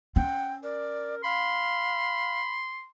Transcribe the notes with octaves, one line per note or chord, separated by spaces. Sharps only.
C#4 F#5 G5
A#4 D5
F5 B5 C6